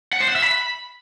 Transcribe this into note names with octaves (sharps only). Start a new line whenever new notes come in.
F#5
C5
F#5
E5
B5